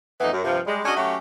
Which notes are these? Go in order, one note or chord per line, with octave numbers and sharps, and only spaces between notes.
F2 E3 A3 B3 D#4
F#2
G2 C3 F3
G3 G#3
C#4 D4 F#4 G#4 D#5
F#3 A3 C#4 F#4 G4